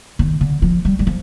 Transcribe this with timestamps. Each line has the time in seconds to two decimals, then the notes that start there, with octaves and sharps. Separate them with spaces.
0.19 D#3
0.41 D3
0.62 F3
0.85 G3
0.99 G3
1.07 F3